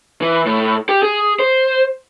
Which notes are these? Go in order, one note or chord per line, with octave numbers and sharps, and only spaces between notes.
E3
A2
G4
G#4
C5